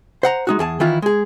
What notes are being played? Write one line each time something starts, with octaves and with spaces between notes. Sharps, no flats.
C5 F#5 A#5
G#3 D#4 F#4
E2 G#4 A5
D#3 E3 E4 F4
G#3 G#4